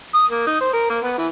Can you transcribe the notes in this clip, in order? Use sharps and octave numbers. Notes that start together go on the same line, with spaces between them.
D#6
A#3
D#4
C5
A#4
A#3
B3
E3